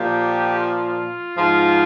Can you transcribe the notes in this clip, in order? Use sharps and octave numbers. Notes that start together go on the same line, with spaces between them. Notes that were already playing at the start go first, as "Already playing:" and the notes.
Already playing: A#2 F3 G4
F4
G#2 F3